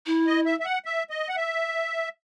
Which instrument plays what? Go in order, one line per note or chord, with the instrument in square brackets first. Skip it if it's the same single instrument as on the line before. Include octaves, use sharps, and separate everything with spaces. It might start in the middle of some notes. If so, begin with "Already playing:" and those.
[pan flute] E4
[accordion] D#5
E5
E5
F#5
E5
D#5
F#5
E5